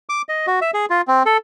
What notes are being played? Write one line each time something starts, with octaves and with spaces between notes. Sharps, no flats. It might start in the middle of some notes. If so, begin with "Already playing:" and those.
D6
D#5
F#4
E5
G#4
F4
C4
A4